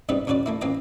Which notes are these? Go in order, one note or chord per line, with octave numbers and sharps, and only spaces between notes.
C2 G#2 C3 G3 B3 B4
E2 C#3 F#4 B4 D5
A3 A#3 E4
A1 A#3 C4 F4 B4 A#5